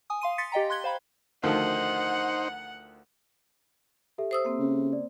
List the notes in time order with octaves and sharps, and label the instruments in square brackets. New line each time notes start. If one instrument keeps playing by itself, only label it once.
[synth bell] G#5 D#6
F5 C6 D#7
C6 A6 B6 C#7
G4 D#5 G5 A#5
C6 F#6 G#6 G7
C5 F5 B5
[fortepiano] D2 D#3 F3 [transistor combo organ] D#4 C5 [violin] F#5
[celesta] G4 A4 E5
[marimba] C5 D#6 E6
A#3 C4
[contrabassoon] C#3
[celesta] D5